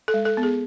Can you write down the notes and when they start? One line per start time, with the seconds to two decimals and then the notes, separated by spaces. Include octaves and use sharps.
0.08 A4
0.14 G#3
0.25 A4
0.37 B3
0.43 G#4